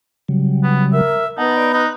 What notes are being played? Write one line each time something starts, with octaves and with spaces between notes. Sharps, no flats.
C#3 F#3 G3
B3
A#4 E5
B3 D#4 F#5 A5
D5
D#4 F#6